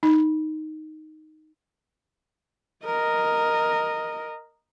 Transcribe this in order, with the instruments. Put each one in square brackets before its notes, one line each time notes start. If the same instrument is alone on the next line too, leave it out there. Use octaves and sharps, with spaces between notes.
[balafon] D#4
[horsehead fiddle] A#4 D#5